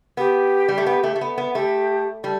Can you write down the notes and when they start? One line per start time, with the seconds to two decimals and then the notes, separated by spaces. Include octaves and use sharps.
0.17 B3 G4
0.69 G3
0.78 A3
0.86 B3
1.03 A3
1.16 A3
1.21 B3
1.38 B3
1.55 A3 G4
2.23 G3 A4